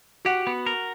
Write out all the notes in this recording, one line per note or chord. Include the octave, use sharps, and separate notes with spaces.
F#4 G4 F#5
B3
A#4